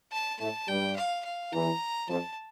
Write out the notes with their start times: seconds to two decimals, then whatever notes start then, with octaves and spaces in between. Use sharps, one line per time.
0.12 A5
0.40 A2 A3 A5
0.68 G2 G3 G5
0.96 F5
1.25 F5
1.52 E2 E3 A#5
2.09 F2 F3 A5